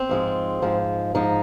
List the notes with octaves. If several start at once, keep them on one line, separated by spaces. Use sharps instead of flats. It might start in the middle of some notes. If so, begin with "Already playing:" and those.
Already playing: C4
G#2 F3 G#3
G#2 F3 G#3
G#2 F3 G#3 D#4